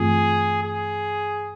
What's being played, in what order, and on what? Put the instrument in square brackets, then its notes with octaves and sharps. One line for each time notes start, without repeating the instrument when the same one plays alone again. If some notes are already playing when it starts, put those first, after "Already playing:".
Already playing: [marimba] G2 E3 A3 C4 F4 [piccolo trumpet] G#4
[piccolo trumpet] G#4